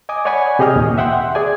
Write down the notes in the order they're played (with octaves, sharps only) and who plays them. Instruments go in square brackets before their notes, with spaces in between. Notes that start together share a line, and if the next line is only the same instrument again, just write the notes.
[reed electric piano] D#5 G#5 D6 D#6
C#5 D5 F#5 G#5 B5 C#6
C3 G4 G#4 D#5 D#6 F6
D#2 A#2
E5 F#5 G5 C6
G#4 D5 G#5